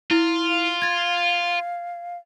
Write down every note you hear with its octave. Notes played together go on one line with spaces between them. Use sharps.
E4 F4
F5
G#6 A6